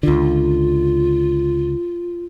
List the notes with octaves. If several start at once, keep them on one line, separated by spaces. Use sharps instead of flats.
C#2 D3 F4